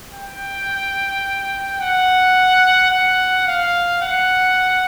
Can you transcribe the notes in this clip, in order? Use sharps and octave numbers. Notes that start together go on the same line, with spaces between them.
G5
F#5
F#5
F5
F#5